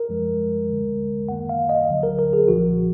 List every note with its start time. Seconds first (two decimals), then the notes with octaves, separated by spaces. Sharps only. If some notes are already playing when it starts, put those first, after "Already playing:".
Already playing: A#4
0.09 F#2 F3 G#3
0.69 D2 D3 G#3
1.29 F#2 D#3 A#3 F#5
1.49 F5
1.69 D#5
1.89 D2 D3 F#3
2.03 A#4
2.19 A#4
2.33 G#4
2.48 B1 A#2 F3 F#4